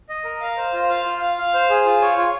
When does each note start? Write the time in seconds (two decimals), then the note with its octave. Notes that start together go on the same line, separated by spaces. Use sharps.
0.09 D#5
0.24 A#4
0.40 F5
0.57 C5
0.73 F4
0.89 F5
1.06 F4
1.21 F5
1.38 F5
1.54 C5
1.70 G#4
1.86 F4
2.02 C#5
2.17 F4